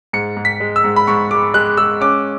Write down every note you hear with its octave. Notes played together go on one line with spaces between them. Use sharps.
G#2 C#7
G#2
B6
G#3
E6
G#2
B5
G#2 C#6
G#3 D6
G#3 F#6
G#3 E6
C#4 D6